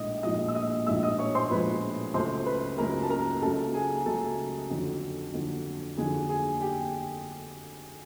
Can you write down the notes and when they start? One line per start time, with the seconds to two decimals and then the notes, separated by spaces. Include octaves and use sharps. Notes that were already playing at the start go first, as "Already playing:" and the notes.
Already playing: A#1 A2 G#3 D#5 D#6
0.23 A#1 A2 F3 G#3 D#5 D#6
0.48 E6
0.55 D#5 D#6
0.87 A#1 A2 F3 G#3 E5 E6
1.03 D#5 D#6
1.19 C#5 C#6
1.35 C5 C6
1.51 A#1 A2 F3 G#3 B4 B5
2.14 C#2 C#3 F#3 A3 C5 C6
2.46 B4 B5
2.78 C#2 C#3 F#3 A3 A#4 A#5
3.03 A5
3.10 A#4 A#5
3.42 C#2 C#3 F#3 A3 A4 A5
3.74 G#4 G#5
4.06 C#2 C#3 F#3 A3 A4 A5
4.70 F2 D3 F#3
5.33 F2 D3 F#3
5.97 F2 D3 F#3 G#4 G#5
6.29 G#4 G#5
6.61 G4 G5